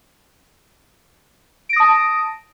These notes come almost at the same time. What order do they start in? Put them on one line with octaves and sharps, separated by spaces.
D7 A#6 D#6 A5